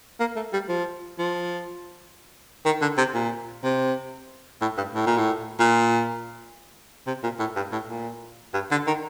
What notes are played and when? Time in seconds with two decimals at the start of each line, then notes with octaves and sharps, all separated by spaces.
0.20 A#3
0.36 A3
0.53 G3
0.68 F3
1.19 F3
2.65 D#3
2.81 D3
2.98 C3
3.14 A#2
3.64 C3
4.61 A2
4.77 G2
4.95 A2
5.06 A#2
5.18 A2
5.60 A#2
7.07 C3
7.23 A#2
7.39 A2
7.56 G2
7.72 A2
7.89 A#2
8.54 G2
8.71 D3
8.87 D#3